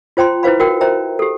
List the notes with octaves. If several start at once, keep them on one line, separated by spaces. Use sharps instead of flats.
F4 C5 G5 A#5 C6
E4 B4 C5 F5 B5
F#4 A#4 G5
C5 E5 G5 A#5
G4 A4